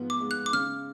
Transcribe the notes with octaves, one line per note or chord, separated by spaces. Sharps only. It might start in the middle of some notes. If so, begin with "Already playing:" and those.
Already playing: G#2 F3 B3
D6
G#3
F#6
D6
C#3 F6